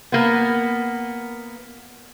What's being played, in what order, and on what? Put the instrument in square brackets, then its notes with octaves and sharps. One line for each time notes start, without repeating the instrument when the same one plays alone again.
[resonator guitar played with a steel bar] A#3 B3